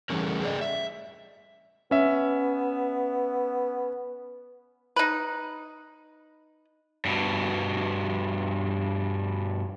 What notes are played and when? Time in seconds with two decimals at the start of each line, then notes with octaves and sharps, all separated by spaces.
0.10 E3 G3 A3 C#4 G#4 A#4
0.41 G#4 A#4 C5 D5 D#5
0.61 E5
1.91 B3 C#4 E5
4.96 D#4 B4
7.05 G2 B2